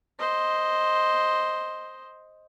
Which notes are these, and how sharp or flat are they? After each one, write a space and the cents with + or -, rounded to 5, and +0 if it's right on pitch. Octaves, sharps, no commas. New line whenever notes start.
C5 +0 D#5 +0